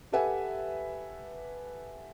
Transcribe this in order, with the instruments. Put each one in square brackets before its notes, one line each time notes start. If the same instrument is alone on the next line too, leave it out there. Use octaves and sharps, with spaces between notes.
[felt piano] G4 A4 B4 E5 F#5 G#5